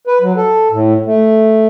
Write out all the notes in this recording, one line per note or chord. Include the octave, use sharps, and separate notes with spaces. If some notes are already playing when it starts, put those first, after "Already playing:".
B4
F#3
A4
A2
A3